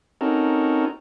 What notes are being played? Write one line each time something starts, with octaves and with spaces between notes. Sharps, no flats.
C4 C#4 D#4 F#4 A4 A#4